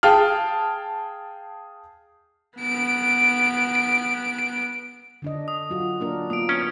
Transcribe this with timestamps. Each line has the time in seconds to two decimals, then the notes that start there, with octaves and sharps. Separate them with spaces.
0.03 G#4 F5 G5 A5 F6
2.59 B3 D7
5.22 D3 D4 D#5
5.48 D#6
5.70 F#3 F4 F#4
6.00 A#3 D4 A#4
6.30 A#3 B3 F4 D#6 D7
6.49 C#4